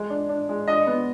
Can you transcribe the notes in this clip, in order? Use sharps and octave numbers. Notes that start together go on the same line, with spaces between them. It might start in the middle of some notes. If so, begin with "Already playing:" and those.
Already playing: G#3
D4
D4
G#3
D4 D#5
B3